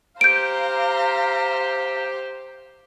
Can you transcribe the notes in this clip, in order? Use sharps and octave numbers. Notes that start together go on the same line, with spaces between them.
G4 C5 F5 A#5 G6 D7